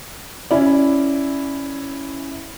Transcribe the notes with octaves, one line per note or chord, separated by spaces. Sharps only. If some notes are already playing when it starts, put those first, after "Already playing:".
C#4 E4 D5